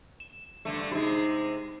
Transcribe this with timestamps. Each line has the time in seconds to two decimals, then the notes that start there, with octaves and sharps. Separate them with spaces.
0.20 E7
0.65 G2 D3 A3
0.92 C3 G#3 D#4